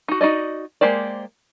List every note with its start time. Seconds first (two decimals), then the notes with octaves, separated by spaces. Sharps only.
0.08 D#4 F#4
0.21 D#4 F#4 D5 D#5
0.81 G#3 A#3 G4 C5 D5